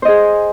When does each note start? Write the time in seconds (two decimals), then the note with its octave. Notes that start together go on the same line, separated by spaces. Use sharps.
0.02 C5
0.05 D#5
0.08 G#4